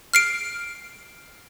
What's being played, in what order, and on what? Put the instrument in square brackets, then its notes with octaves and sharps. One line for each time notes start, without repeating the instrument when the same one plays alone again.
[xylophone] F6 C7 D7